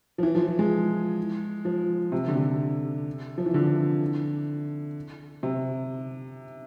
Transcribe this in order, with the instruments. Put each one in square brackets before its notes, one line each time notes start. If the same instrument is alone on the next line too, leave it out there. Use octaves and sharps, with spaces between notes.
[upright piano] F3
E3
F3
F3
G#3
F3
C3
D3
C3
F3
E3
D3
C3